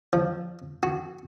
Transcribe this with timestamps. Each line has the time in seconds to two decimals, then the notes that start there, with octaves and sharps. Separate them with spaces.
0.13 F3
0.83 F#4